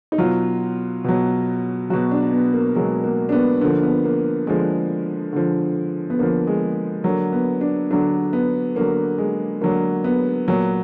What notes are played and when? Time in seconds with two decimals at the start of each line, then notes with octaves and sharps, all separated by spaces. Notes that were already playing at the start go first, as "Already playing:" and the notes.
0.12 D#4
0.18 B2 F#3 F4
1.04 B2 F#3
1.90 B2 F#3 F#4
2.11 D4
2.33 B3
2.54 A#3
2.75 B2 F#3 G#3
3.04 A#3
3.29 D4
3.32 B3
3.61 D3 F3 A#3
3.83 B3
4.04 A#3
4.47 D3 F3 G#3
5.33 D3 F3
6.10 B3
6.19 D3 F3 A#3
6.47 G#3
7.04 D3 F#3 A#3
7.32 B3
7.61 D4
7.91 D3 F#3 D4
8.33 B3
8.76 D3 F#3 A#3
9.18 G#3
9.61 D3 F#3 A#3
10.04 B3
10.48 A#2 F#3